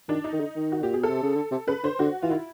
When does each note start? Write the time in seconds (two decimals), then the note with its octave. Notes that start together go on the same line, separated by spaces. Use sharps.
0.09 D#3 D4
0.24 D#4
0.33 D#3
0.40 D3
0.56 D#3
0.72 F#4
0.83 A#2 G4
0.94 B2 G#4
1.03 A4
1.09 C3
1.23 C#3
1.36 D3
1.51 C3
1.68 C#3 B4
1.84 D3 C5
1.99 D3 F#4
2.22 E3 F4
2.30 D#3 E4